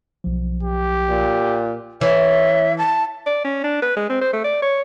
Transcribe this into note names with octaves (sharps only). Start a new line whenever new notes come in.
B1 F3
G4
A#2
E3 C#5 E5
A5
D5
C#4
D4
B4
G#3
C4
C5
A3
D5
C#5